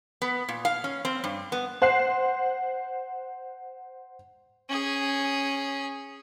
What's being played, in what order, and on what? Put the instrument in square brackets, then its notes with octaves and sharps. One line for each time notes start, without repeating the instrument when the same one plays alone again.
[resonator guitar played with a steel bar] B3
A#2
F5
C#4
C4
G2
B3
[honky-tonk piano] C5 F#5 F#6 C7
[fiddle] C#4 G#4